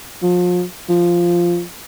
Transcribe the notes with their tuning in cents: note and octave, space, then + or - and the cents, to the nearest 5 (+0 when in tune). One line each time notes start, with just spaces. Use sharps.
F3 +35
F3 -5